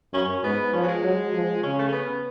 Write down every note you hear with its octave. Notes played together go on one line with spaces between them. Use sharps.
F#2 C#4
G#2 B3
F3 C#4
F#3
G#3
F#3
F3
C#3 C#4
A3
C#4
B3